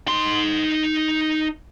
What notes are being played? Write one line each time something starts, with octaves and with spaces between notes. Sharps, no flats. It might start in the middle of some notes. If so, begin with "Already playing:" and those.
D#4 C6